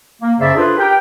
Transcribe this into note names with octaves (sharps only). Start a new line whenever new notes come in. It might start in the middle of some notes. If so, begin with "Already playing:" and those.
A#3
F#2 C#3 C5 D5 E5
D4 F4 G#4 A4 B4 C5
G4 A#4 B4 G5